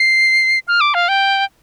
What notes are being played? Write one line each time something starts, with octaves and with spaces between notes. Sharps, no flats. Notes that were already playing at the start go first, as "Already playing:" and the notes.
Already playing: C7
F6
D6
F5
G5